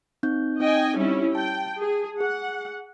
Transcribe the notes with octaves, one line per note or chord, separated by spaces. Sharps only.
C4 D#4 G6
C4 D#4 D#5 G5 G#5
G3 C#4 E4
G5 A5
G#4
G#4 F#5